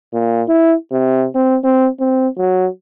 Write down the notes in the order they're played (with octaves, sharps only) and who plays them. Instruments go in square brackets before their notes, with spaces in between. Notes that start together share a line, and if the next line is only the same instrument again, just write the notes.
[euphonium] A#2
E4
C3
C4
C4
C4
F#3